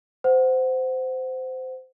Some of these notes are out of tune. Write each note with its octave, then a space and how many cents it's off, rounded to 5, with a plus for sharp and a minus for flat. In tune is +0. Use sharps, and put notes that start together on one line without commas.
C5 -20 F#5 +0